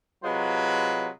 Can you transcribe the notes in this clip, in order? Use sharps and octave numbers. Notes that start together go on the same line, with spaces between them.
C3 F#3 G#3 F4 B4